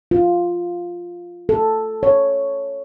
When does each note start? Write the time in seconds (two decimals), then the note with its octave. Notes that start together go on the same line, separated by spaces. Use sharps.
0.11 F4
1.49 A4
2.03 C#5